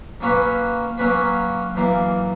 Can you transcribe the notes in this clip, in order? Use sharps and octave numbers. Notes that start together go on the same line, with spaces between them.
F#3 A#3 C#4 F#4 B4
F#3 A#3 C#4 F#4 B4
F#2 E3 A#3